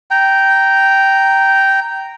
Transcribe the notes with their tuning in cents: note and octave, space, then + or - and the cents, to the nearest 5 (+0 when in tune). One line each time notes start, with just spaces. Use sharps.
G5 -10 A#5 -5